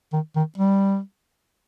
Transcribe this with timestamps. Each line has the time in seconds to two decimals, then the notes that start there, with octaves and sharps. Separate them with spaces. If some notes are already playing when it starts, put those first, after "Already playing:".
0.13 D#3
0.36 D#3
0.58 G3